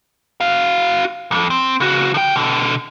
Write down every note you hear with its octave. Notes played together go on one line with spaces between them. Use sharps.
F#4 F5
B1 F2
C4
C#3 F#4
D3 G5
B2 D3